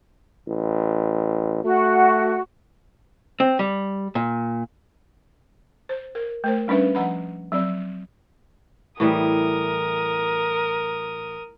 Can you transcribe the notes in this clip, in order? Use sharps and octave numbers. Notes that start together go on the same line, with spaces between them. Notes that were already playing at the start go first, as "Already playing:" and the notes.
A1
A3 F#4
C4
G3
A#2
C5
A#4
A3 A#4 C5
G3 C#4 D4 B4 E5
F3 F#5 A#5 B5
F#3 C4 D5
A2 E3 G3 A#4 D#6